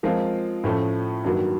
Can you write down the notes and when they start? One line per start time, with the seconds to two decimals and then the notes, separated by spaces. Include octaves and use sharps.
0.03 F3 G#3 C4 F4 A#4
0.64 A2 F3 A3 C#4
1.24 G2 D#3 F#3 A#3